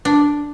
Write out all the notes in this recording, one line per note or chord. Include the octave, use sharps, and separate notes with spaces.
D4